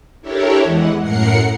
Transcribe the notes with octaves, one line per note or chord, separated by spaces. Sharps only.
D4 E4 G4 A4 A#4 C#5
E2 E3 G#3 F#5
F#2 A2 A#4 F#5 C7 C#7